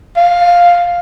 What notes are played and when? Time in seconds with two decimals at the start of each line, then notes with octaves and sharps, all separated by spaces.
0.17 F5